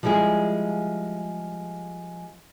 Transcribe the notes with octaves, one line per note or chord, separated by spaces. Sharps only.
F3 G3 G#3 E4 G#4